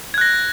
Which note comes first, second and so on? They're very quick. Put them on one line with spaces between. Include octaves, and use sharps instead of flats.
G#6 F#6 A#6